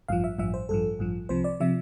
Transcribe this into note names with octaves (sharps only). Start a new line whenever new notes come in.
A1 G2 F3 F5
E5
A1 G2 F3 E5
C5
A1 G2 F3 A4
A1 G2 F3
C2 C3 F3 C5
D5
C3 F3 E5